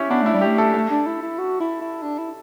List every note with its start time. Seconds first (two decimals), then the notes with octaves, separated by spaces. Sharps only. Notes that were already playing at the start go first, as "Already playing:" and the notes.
Already playing: C#4 E4 G4
0.10 B3 D4
0.22 A3 E4
0.34 G3
0.41 A3 G4
0.58 A4
0.74 A3 A4
0.90 D4
1.06 E4
1.22 E4
1.38 F#4
1.60 E4
1.81 E4
2.02 D4
2.18 E4